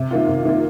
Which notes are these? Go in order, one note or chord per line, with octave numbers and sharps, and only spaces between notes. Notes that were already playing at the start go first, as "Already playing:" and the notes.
Already playing: C3
D#3 A#3 F4
C3
D#3 A#3 F4